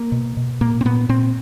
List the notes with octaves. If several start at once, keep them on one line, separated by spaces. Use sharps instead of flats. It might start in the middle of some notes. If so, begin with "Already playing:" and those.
Already playing: A#3
B2
B2
A#2 A#3
C4
A#2 B3
A#2 C4